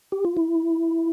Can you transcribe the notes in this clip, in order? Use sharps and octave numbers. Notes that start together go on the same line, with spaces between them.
G4
F4
E4